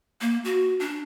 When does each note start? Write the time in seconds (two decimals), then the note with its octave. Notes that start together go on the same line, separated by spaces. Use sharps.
0.21 A#3
0.45 F#4
0.80 D4